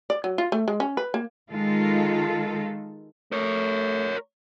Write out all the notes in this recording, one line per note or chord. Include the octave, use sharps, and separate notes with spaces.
D5
F#3
F4
A3
G#3
C#4
B4
A#3
D#3 G#3 F4 A4
A3 A#4 C#5